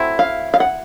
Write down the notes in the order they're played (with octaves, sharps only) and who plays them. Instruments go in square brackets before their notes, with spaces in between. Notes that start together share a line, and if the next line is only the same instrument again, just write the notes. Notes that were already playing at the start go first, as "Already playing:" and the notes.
Already playing: [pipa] F#3 A3 C4 E4
[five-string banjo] F5
F5
F#5